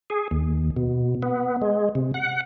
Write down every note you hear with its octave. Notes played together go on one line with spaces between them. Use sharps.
G#4
D#2
B2
B3
G#3
C3
F#5